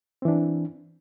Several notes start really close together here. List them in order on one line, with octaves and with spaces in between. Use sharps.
C4 E3 D4